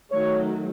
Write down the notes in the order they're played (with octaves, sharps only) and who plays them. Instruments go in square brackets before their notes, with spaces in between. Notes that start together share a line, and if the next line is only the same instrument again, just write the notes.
[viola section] D#3 F#3 A3 [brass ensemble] C#5